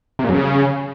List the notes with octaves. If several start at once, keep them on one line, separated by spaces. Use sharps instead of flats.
C3
A#2
F#2
C#3